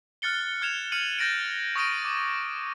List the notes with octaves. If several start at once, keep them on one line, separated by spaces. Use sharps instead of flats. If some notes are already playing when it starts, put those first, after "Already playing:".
F6 F#6 A6 C#7 G7
F6 G#6 C#7 E7 F7
F6 C#7 D#7 F#7
G6 A6 A#6 C#7 D7
C#6 D#6 A#6 D7 D#7
D6